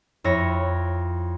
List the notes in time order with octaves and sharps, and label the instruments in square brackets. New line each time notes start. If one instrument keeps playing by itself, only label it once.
[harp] F2 E4 C#5 A#6